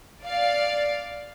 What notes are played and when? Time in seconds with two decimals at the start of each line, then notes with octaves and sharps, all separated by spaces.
0.23 D5 F5